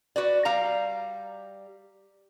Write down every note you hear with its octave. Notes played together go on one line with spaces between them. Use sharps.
F#4 B4 D5
G3 F5 A#5